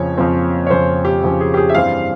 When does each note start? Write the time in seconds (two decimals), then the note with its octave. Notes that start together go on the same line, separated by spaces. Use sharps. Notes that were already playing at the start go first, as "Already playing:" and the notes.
Already playing: F2 C#3 F3 C4 C#5
0.17 F2 C#3 F3 C4
0.67 C#5
0.70 F2 C#3 F3 C4 C5
1.05 G4
1.23 F2 C#3 F3 C4
1.41 G#4
1.54 G4
1.57 G#4
1.69 E5
1.74 G2 E3 G3 C4 F5